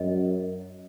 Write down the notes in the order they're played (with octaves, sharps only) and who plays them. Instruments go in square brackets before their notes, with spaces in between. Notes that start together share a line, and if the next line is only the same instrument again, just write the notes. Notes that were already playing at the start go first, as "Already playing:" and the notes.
Already playing: [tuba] F#2 [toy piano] D#5